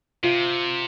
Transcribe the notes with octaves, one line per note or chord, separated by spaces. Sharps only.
C3 F4